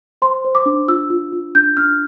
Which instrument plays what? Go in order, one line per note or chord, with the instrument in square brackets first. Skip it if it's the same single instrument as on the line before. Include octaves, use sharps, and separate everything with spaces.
[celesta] C5 C6
C5
D6
D4
F4 E6
F4
F4
D4 G6
D4 F6